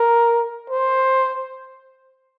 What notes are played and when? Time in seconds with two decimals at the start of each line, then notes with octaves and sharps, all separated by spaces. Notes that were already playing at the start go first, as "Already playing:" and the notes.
Already playing: A#4
0.70 C5